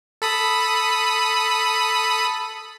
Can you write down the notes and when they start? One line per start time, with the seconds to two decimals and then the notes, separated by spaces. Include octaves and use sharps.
0.22 A4 B5 D#6